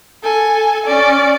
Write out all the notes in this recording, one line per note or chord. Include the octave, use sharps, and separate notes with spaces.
A4 G#5
C#4 D5